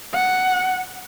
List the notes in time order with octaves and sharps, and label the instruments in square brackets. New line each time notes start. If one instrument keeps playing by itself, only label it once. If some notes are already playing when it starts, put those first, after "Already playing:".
[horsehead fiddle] F#5